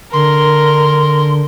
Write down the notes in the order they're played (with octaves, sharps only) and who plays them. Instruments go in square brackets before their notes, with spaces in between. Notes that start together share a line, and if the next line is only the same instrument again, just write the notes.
[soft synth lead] D3 [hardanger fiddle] A#4 [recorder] C6